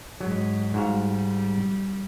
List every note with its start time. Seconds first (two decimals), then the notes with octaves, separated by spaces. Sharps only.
0.20 G#2 F#3
0.74 G#2 G3 F#4 F5